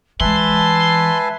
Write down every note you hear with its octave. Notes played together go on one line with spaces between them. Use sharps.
E3 G#3 B4 E5 G#5 A5 C6